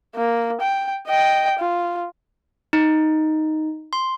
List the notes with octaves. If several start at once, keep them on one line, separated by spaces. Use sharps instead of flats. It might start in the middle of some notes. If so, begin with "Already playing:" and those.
A#3
G5
D#5 G5
F4
D#4
C6